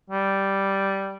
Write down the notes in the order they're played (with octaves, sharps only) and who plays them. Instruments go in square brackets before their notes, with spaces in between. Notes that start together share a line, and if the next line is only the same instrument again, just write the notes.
[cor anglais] G3